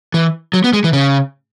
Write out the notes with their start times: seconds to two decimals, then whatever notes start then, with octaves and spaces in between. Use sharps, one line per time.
0.14 E3
0.53 F#3
0.64 B3
0.73 G#3
0.84 E3
0.93 C#3